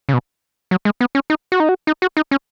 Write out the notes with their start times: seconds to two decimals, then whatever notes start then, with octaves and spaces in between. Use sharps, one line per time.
0.09 C#3
0.13 B2
0.71 F#3
0.85 G#3
1.01 B3
1.15 C#4
1.30 D#4
1.52 F#4
1.60 D#4
1.69 F#4
1.87 D#4
2.02 F#4
2.17 D#4
2.31 C#4